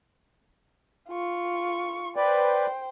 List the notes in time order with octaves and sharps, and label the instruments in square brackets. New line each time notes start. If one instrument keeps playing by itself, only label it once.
[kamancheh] F4 C#6
[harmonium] B4 D5 [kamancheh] C5 G5